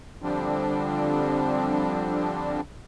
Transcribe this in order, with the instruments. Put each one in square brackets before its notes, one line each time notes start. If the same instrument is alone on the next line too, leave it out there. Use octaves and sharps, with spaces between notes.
[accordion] D3 F3 G3 C4 D4